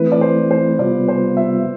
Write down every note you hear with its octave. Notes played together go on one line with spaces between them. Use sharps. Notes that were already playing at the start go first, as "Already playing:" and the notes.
Already playing: E3 A3 C4 E4 B4
D5
C5
C5
C3 G3 B3 F4 D5
C5
E5